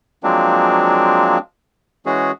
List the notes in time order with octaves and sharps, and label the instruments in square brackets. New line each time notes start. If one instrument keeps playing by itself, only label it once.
[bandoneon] F3 F#3 G#3 A#3 C4 D4
E3 G#3 C#4 F#4 G#4